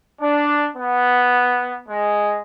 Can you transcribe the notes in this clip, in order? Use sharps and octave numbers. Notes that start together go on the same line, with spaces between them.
D4
B3
G#3